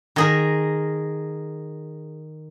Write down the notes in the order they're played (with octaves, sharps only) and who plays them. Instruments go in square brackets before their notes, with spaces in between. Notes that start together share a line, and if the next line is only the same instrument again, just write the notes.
[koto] D#3 G#4 A#4